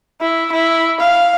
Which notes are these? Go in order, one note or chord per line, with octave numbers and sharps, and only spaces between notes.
E4
E4
F5